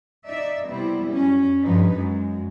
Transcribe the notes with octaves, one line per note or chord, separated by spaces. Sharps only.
D#4 D5 E5
C3 G3 B3 C4 E4
F#2 C#4
G2 F3 D#4 B4
F#2 G#3